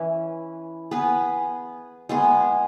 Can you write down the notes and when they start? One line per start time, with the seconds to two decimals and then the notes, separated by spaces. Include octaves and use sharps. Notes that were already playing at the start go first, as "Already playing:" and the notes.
Already playing: E3 C#4 E4 B4
0.91 B3 G#4 B4
2.09 G#3 B3 G#4